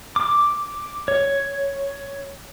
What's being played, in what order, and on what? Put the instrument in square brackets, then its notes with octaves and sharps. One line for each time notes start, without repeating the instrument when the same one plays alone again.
[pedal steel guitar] D6
C#5